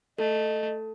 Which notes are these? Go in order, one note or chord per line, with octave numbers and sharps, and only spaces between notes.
A3 A4 D#5